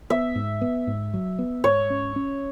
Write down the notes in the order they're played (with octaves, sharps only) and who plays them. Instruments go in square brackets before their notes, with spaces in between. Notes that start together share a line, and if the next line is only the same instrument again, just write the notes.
[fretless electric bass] B3 [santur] E5
[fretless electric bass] G#2
B3
G#2
F#3
B3
[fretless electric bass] G#2 [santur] C#5
[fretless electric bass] C#4
C#4